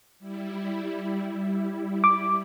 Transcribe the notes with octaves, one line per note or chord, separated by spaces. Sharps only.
G3 E4
D6